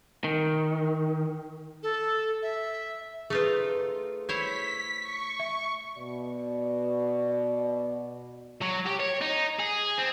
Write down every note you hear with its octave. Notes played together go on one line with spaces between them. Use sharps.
D#3
A4
E5
A3 D#4 F4 G#4 B4
E4 C5 C#5 B6
C#6
E5
B2 D5
F#3
G4
C#5
D#4
G#4
C4